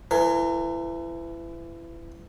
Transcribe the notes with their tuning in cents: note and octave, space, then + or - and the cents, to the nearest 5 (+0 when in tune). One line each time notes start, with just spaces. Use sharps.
E3 +30 A#4 -30